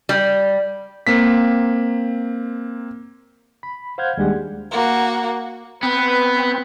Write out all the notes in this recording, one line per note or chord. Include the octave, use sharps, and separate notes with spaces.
G3
A#3 C4 B6
B5
C5 F5 F#5 F6 G6 G#6
D#2 G3 G#3 D4 G4 F#5
A#3 F#4
B3 C4 B4